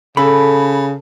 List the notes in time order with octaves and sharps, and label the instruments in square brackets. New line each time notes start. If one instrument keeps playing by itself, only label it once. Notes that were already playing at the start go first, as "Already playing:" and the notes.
[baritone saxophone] C#3 [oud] A4 [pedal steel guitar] B5